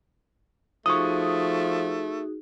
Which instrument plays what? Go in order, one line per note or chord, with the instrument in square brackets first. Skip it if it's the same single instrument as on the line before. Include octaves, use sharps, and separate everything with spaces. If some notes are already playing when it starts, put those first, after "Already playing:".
[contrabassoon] F3 [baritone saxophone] A3 [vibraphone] D#4 F#4 G#4 [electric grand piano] C#6 D#6